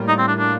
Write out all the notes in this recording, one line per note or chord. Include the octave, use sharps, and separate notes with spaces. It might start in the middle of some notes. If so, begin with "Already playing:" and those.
Already playing: A2 G3 A#3 F4
D#4
C4
D4
D4